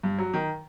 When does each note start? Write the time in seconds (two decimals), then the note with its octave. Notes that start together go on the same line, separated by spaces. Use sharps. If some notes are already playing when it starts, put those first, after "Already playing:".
0.03 G2
0.18 F#3
0.33 D#3